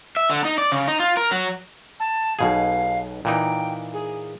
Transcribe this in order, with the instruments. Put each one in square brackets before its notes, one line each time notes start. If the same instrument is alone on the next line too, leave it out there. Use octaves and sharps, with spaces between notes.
[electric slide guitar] E5
D3
D#4
D5
C#3
D#4
F4
A#4
F#3
[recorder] A5
[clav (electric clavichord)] B1 B2 G#4 [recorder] F5
[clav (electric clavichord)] A#2 E3 D#4 [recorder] G5
[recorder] G#4